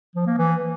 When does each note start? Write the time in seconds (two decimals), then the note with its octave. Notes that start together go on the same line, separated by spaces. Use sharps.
0.15 F3
0.27 A#3
0.38 E3